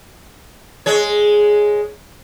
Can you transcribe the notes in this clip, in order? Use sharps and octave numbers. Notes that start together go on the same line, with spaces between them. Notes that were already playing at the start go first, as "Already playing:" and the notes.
G#3 C#5